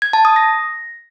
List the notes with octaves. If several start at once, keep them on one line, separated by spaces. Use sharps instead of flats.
G#6
A5
D#6
A#6